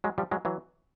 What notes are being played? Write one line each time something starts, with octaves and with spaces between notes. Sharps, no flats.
F#3 G#3
F3 G3
F#3 G#3
E3 F#3